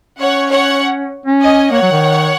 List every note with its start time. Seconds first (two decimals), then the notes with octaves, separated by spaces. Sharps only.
0.19 C#4 C#5 F#5
0.50 C#5 F#5
1.26 C#4
1.41 D#5 G#5
1.71 A#3 C#5 F#5
1.82 F#3
1.92 D#3